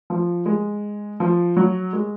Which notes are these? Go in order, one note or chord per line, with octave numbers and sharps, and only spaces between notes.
F3
G#3
F3
F#3
G#3